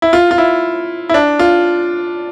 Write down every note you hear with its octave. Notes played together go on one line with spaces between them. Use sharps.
E4
F4
F4
E4
E4
D4
F4